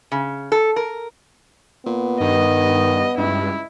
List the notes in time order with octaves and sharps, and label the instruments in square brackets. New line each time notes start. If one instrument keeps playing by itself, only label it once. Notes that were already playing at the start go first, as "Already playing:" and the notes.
[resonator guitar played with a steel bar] C#3
A4
A#4
[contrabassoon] A#2 [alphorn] B3
[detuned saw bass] G2 [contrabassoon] D#3 [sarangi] D#5
[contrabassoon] C#2 [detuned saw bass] G2 [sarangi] E4